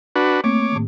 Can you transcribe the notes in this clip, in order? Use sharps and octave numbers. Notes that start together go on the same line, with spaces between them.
D4 F#4 B4
A3 A#3 C4 C#5 D6
A2 D#3